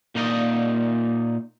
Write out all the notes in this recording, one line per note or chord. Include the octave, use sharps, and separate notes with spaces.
A#2 A#3 D#4 A#4 D5 D#5